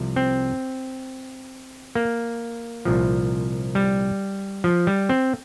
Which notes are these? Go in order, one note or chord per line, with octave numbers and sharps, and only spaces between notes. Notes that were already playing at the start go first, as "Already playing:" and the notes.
Already playing: C2 C3 F3
C4
A#3
C2 A#2 F3
G3
F3
G3
C4